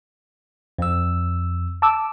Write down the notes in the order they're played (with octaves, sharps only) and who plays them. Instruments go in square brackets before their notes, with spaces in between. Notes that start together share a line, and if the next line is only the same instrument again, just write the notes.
[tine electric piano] F2 E6
[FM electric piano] A5 D6 E6